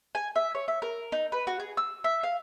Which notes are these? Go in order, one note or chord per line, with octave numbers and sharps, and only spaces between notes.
G#5
E5
C#5
E5
A#4
D#4
B4
F#4
G#4
E6
E5
F5